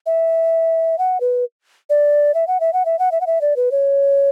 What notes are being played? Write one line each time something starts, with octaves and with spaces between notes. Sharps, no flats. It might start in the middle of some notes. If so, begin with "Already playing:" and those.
E5
F#5
B4
D5
E5
F#5
E5
F#5
E5
F#5
E5
F#5
E5
D5
B4
C#5